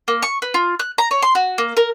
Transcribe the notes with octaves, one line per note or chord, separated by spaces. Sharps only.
A#3
C#6
B4
F4
F#6
A#5
C#5
C6
F#4
A#3
A#4